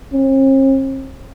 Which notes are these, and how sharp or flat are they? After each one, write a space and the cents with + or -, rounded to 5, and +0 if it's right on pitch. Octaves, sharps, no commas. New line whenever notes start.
C4 +45